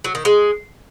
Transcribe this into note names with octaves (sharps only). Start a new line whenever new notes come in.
F#3
D#3
G#3